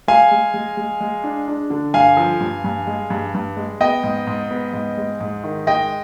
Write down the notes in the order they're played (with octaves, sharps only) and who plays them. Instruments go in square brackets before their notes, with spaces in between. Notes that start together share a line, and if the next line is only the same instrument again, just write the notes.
[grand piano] G#3 F5 G#5
G#3
G#3
G#3
G#3
D4
D4
D3
G2 F5 G#5
F3
G2
G2
G#3
G2
G2
G#3
B3 D#5 G5
G#2
G#2
B3
G#2
G#3
G#2
D#3
G#3 D#5 G5